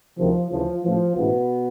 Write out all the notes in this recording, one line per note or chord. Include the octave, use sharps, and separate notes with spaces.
D2 C3 D#3 F3
D2 C#3 E3 F3
A1 A2 E3 F3
A1 G#2 B2 E3 B3